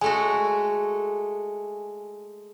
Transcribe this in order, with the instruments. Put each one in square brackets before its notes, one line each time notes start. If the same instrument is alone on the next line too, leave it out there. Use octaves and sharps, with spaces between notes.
[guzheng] G#3 A3 F#4 [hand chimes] G#5